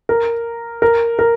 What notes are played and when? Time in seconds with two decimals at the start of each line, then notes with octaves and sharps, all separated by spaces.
0.09 A#4
0.82 A#4
1.19 A#4